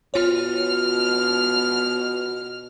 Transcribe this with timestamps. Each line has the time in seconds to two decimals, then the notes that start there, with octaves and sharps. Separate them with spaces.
0.14 B2 F4 C#5 F6